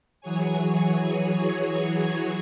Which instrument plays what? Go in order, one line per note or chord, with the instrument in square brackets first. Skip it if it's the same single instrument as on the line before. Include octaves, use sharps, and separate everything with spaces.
[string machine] E3 F#3 F#4 G#4 C#5 G#5